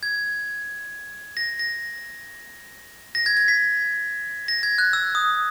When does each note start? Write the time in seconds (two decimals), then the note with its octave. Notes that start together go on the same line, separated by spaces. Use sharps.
0.03 G#6
1.37 A#6
1.59 A#6
3.15 A#6
3.26 G#6
3.37 G#6
3.48 B6
4.48 A#6
4.63 G#6
4.78 F#6
4.93 E6
5.15 D#6